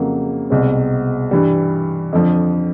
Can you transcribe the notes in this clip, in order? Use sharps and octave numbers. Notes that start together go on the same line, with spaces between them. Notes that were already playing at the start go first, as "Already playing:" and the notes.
Already playing: F2 C#3 F#3 A#3
C2 B2 G#3 C4
G2 E3 G3
F2 D3 F3